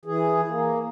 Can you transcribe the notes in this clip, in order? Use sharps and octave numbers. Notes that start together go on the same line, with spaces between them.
E3 G#4
A#3